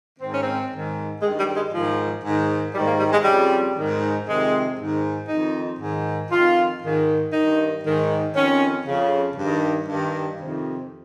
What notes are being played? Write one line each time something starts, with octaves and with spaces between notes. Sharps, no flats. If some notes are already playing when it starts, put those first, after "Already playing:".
G#2 D#3 C4
C#4
C4
G#2 D#3
G2 D#3 G#3
G3
G#3
G#2 D#3 F3
G#2 D#3
G#2 D#3 G3
A#3
G3
G#3
F2 C#3 G3
G#2 D#3
F2 C3 D#3 G#3
G#2 D#3
F2 D#3 D#4
G#2 D#3
F2 D#3 F4
G#2 D#3
G2 D#3 D#4
G#2 D#3
F2 D#3 C#4
F2 C#3
G2 D#3
G2 D#3
F2 C3 D#3